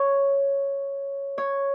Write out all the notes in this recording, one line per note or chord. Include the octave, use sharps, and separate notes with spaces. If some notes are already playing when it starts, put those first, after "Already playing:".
Already playing: C#5
C#5